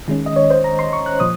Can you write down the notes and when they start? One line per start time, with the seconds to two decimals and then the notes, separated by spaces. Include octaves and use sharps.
0.08 D#3 G#3 C#4
0.26 D#5
0.36 C#5
0.50 C5
0.64 A#5
0.79 C6
0.93 C#6
1.06 F#6
1.20 A#2 F3 D#6